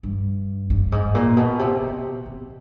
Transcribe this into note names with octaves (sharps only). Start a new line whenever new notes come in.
G2
G2
G#2
A#2
B2
C3
B2
C3